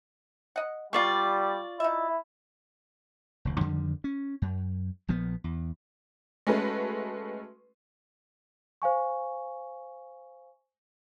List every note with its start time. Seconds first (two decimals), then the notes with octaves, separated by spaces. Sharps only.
0.56 D#5 F#5
0.93 B2 G3 F4 D5 B5 C#6
1.80 D#4 E4 E5
3.45 F1 D2
3.61 F2 D3 D#3 G3
4.04 C#4
4.42 F#2
5.08 A#1 F3 B3
5.44 E2
6.47 G#3 A3 C#4 F#4 B4
8.82 C5 F5 G#5 C#6